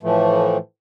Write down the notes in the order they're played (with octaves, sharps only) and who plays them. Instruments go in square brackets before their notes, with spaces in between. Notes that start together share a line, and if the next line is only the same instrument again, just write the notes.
[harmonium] A2 E3 F3 A3